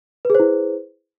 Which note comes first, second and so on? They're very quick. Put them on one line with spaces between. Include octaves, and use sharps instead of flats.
B4 G#4 C5 E4